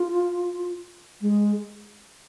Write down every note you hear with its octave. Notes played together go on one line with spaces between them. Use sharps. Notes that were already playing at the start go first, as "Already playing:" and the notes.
Already playing: F4
G#3